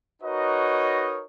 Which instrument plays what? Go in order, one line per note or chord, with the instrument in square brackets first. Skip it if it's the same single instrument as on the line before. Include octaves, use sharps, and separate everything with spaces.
[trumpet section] D#4 F#4 A#4 B4 C#5 D#5